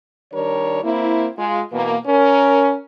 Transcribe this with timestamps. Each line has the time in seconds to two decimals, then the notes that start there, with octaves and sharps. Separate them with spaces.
0.33 D#3 G3 D4 A#4 C#5
0.83 A#3 C4 E4
1.37 G#3 F4
1.73 B2 E3 A#3
2.07 C#4 A#4